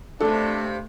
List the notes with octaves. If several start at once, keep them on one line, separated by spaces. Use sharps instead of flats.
G2 C3 A3 D4 A4